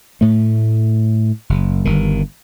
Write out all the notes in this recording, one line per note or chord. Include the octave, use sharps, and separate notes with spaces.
A2 A3
F#1
G1 G2 D#3